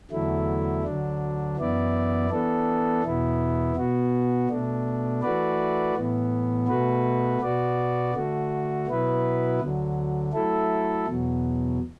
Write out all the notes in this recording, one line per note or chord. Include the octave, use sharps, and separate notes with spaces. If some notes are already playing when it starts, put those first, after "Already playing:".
E2 D3 F#3 A3 E4
D2 D3 F#3 D4
F#2 E3 B3 E4 D5
E3 B3 D4 A4
E2 B2 B3 E4
B2 B3 F#4
B2 A3 D4
E3 A3 F#4 B4 D5
A2 E3 B3
B2 A3 F#4 B4
B2 B3 F#4 D5
D3 A3 F#4
B2 F#3 B3 E4 B4
D2 D3 F#3
F#3 A3 E4 A4
E2 B2 F#3